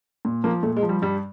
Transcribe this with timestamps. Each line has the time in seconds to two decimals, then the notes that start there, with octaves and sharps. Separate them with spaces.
0.25 A#2
0.44 F3 A#3
0.63 A#2 A3
0.77 G#3
0.83 F3
0.89 G3
1.02 G2 G3